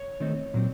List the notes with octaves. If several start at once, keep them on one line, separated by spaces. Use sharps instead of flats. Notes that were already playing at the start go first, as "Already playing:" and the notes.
Already playing: C#5
D#3 A3 C4 D#4
A#2 F#3 C4